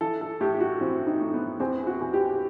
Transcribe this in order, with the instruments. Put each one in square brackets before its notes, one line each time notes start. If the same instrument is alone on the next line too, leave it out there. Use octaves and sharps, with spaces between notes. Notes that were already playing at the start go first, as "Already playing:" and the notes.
[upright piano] E3 A4
A4
A2 G4
G4
F#4
E3 C4
D#4
A2
B3
E2 C4
F#4
E2
G4